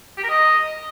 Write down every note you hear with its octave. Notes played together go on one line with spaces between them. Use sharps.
G4
A#4
D#5